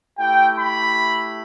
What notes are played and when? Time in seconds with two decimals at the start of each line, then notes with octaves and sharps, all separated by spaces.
0.18 A3 E4 G4 G5
0.58 B5